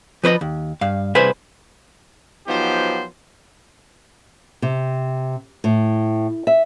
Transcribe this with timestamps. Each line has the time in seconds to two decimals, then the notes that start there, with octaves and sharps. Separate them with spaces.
0.24 F3 B4 C5 D#5
0.41 D#2
0.81 G2 F5
1.15 C2 G#4 B4 C5 E5
2.47 F3 F#3 B3 D#4 G4 C5
4.62 C3
5.64 A2
6.47 E5